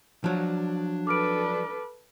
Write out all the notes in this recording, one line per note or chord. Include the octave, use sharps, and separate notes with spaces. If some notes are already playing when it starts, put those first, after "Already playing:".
F3 F#3 D4
A4 B4 D6 F6 D7